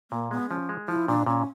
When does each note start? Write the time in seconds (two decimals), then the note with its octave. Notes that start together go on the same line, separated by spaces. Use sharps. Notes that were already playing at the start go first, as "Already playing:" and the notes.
0.11 A#2 A#3
0.31 G#3 B3
0.50 F3 C#4
0.69 G#3
0.88 F3 E4
1.08 A#2 D4
1.26 A#2 C#4